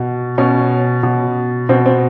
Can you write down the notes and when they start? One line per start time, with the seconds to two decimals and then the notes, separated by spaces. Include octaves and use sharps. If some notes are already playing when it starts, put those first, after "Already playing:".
Already playing: B2
0.38 B2 C#4
1.03 B2
1.69 B2 C4
1.86 C4